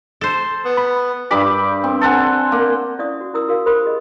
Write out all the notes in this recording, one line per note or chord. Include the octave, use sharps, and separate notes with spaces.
A4 C5
B3
B5
G2 G4 B5 D6
C4
A4 C5 F#5 G#5
A#3
C#4 E4 D5 F5 C#6 D#6
F#4
C#4 E4 A#4 A#5 D#6 E6
F#4 A#4 F5
G4 A#4 C5 B5 C6 D#6
G#4 D#5